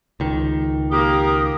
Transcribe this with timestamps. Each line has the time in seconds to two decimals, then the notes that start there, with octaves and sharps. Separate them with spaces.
0.20 C#2 D#3
0.91 A#3 G4 A#4 D#6